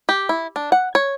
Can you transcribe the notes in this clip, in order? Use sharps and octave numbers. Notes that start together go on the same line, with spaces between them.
G4
E4
D4
F#5
C#5